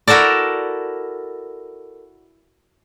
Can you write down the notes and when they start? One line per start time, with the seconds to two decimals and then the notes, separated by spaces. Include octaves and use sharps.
0.08 E4 F#4 A4 A#4 D5